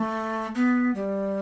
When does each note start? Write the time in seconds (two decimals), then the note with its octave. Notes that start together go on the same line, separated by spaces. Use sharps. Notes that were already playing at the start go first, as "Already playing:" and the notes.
Already playing: A3
0.55 B3
0.95 G3